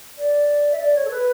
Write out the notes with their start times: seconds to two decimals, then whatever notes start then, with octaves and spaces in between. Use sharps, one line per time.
0.18 D5
0.72 E5
0.80 D5
0.95 C#5
1.05 A4
1.11 B4